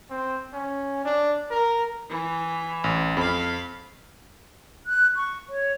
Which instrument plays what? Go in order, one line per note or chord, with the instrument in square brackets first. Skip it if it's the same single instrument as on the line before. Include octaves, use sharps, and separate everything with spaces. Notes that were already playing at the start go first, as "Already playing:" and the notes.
[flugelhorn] C4
C#4
D4
A#4
[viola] E3
[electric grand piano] A1
[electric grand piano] F2 [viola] F5 B5
[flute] F#6
C#6
C#5